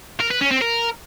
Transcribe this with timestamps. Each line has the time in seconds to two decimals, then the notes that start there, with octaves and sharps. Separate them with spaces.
0.20 A#4
0.31 B4
0.41 C#4
0.51 C4
0.61 A#4